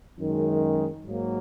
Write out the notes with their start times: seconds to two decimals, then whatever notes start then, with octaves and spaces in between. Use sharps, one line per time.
0.18 F#2 D#3 G#3
1.05 G#2 F#3 A#3